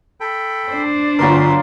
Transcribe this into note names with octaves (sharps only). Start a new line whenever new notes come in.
A4 G5 B5
D4 C5
G1 D2 F#3 F4 A#4 B4 C6 D#6